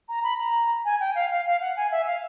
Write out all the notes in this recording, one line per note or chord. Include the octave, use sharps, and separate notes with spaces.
A#5
B5
A#5
G#5
G5
F5
F5
F5
F#5
G#5
E5
F5